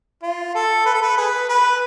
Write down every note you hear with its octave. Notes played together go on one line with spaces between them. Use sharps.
F4
A4
B4
A4
B4
G#4 B4
B4